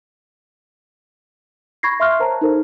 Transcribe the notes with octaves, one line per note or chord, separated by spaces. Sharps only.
B5 C#6 G#6 A#6 C7
E5 F5 C6 C#6 F6 F#6
A#4 C5 C#5 A5 A#5
D#4 A4 A#4 C5